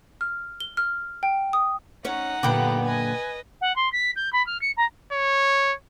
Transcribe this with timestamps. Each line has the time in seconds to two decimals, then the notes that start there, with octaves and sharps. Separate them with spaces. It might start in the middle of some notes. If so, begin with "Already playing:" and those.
0.21 F6
0.60 G7
0.77 F6
1.23 G5
1.53 D#6
2.05 C#4 D#4 C#5 F#5
2.43 F#2 A#2 D3 B3 G4 G5 B5 D6
2.85 B4 D#5 G#5
3.61 F#5
3.76 C6
3.92 B6
4.15 G6
4.32 B5
4.46 F6
4.61 C#7
4.77 A#5
5.12 C#5